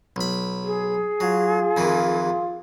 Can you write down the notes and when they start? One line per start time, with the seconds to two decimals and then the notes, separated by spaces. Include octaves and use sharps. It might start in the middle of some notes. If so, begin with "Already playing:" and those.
0.16 B1 B5
0.64 G#4
1.20 F#3 F4
1.77 F2 D#3 E3